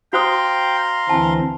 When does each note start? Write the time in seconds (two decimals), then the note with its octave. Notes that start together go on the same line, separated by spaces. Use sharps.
0.13 F#4 C5 F5 G5 A#5 C6 D#6
1.10 D2 E3 C4 G#5 A5